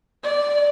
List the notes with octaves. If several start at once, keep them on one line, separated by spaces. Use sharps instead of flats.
D5